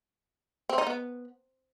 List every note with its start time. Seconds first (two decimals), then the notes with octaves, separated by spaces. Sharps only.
0.69 C4
0.78 D#4
0.87 B3